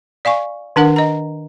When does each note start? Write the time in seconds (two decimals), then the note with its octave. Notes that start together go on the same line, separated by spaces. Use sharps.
0.25 D5 F5 G#5 C#6
0.76 D#3 D4 A#4 F#5
0.96 D#5 A#5